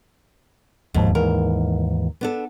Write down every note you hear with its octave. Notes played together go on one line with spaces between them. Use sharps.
E1 D#2 G#2 F3
D#2 G#2 E3 A#4
B3 D4 A4